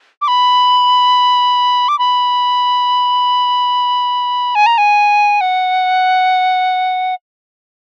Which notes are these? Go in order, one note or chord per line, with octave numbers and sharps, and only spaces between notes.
D6
B5
D6
B5
G#5
A#5
G#5
F#5